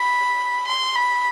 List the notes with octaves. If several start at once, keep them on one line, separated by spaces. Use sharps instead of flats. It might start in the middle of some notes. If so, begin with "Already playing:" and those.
Already playing: B5
C6
B5